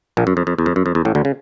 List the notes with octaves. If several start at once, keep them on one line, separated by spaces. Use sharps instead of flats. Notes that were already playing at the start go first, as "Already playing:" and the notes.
A#1 A#2
F#2
F2
F2
E2
F2
F#2
F2
E2
A1 A2
D2 D3
C#3